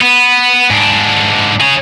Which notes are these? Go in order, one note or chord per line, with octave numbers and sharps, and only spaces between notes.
B3
G#2 D4
G#4 C#5